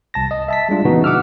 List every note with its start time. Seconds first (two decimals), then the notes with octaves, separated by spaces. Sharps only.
0.14 C2 A5 A#6
0.31 D#5
0.48 E5 A5 B6
0.69 G3 G#3 D4 F4
0.85 A#2 C#3 E3 B3 D#4 F#4
1.04 F#5 D6 E6 F6